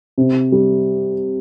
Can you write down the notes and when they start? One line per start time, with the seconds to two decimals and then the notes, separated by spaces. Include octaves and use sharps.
0.18 C3
0.52 G3